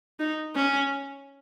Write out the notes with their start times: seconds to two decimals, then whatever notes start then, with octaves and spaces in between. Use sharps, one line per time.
0.19 D#4
0.55 C#4